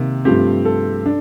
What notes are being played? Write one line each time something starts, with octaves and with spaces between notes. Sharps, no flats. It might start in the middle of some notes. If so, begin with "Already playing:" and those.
Already playing: C3 D#3 A#3
G2 F3 A3 C4 G4
A4
D4